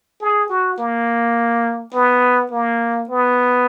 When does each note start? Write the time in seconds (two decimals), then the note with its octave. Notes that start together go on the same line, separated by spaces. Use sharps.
0.21 G#4
0.50 F#4
0.78 A#3
1.94 B3
2.52 A#3
3.09 B3